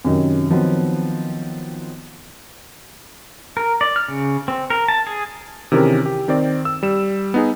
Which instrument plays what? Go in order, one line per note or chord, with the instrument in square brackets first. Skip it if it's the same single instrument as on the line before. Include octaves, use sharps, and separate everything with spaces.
[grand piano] F#2 C3 D#3 F#3
D#3 F3 F#3 B3 C4
[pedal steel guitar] A#4
D5
F6
C#3
C4
A#4
A5
G#4
[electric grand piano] C3 D#3 E3 C#4 G#4 A#4
G4
D#3 C4 D5
E6
G3 E7
B3 D#4 G#4